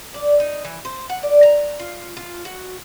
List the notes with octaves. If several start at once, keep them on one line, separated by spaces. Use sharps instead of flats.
D5
D#4
E3
C5
F#5
D5
A#5
F4
F4
F#4